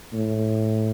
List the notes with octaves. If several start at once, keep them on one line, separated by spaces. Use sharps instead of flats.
A2